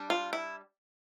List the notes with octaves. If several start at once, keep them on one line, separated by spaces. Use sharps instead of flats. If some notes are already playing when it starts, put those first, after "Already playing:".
Already playing: G3 D4
F4
E4